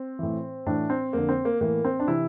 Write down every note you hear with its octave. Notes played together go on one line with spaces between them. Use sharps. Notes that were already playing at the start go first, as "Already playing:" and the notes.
Already playing: C4
A2 E3
A2 E3 D4
C4
F2 D3 A#3
C4
A#3
A2 E3 A#3
C4
D4
C3 E3 E4